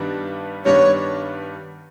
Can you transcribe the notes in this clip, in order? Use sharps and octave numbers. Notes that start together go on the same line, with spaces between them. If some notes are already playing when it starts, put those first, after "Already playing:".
Already playing: G2 D#3 G3 B3 D4
G2 D#3 G3 B3 D4 C#5